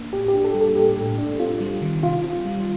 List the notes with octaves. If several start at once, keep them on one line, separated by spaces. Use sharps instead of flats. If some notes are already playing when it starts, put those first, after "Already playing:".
Already playing: A#3 D4
A2 G4
G4
D4
A4
G3
A4
A2 G4
A2
D4
C4 F4
G3
D#3
C3 F4
C4
G3